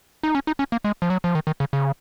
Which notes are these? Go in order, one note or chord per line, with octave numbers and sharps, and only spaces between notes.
D#4
C#4
D#4
C#4
A#3
G#3
F3
F#3
F3
D#3
D#3
C#3
C#3